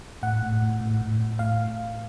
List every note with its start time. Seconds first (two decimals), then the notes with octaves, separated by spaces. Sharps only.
0.23 A2 F#5
0.42 A2
0.62 A2
0.81 A2
1.01 A2
1.20 A2
1.39 A2 F5